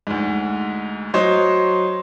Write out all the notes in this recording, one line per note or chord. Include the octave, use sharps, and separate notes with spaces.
D2 G#2
F#3 C5 C#5 D#5